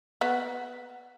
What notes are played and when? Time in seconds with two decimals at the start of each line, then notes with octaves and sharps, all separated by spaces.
0.21 B3 F#4